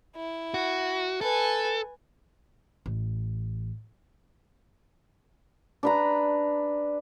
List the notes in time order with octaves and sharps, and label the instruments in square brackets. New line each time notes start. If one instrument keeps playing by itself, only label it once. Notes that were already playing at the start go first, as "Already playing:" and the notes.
[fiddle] E4
[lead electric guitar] F#4
[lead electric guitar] A4 [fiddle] B4 G#5
[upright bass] A1
[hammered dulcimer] D4 B4 A#5